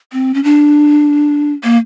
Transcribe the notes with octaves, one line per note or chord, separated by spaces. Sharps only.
C4
C#4
D4
A#3